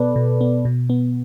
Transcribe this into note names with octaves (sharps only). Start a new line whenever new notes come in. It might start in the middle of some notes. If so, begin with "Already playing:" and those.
Already playing: B2 B3 A4 B4 D5
B2
B3
B2
B3